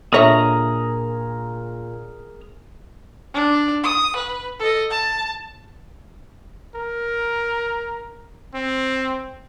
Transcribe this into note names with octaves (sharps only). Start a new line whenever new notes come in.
A#2 D3 G#4 A#4 C#5 E5 A#5
D4
D#6
B4
A4 D#5
A5
A#4
C4